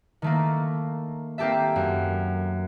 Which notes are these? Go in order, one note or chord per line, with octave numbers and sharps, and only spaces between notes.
D#3 A3 A#3
A#3 C4 G4 A4 E5
F#2